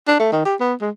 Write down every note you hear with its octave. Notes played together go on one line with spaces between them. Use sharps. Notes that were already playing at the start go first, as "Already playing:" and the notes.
D4
A3
D#3
G4
B3
G#3